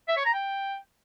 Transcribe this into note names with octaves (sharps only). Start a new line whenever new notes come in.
E5
C#5
A#5
G5